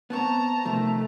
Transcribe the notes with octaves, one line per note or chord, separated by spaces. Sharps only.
B3 C4 C#5 A5 A#5
C3 D#3 F3 A3